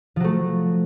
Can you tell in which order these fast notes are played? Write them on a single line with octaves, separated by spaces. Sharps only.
F3 F#3 A3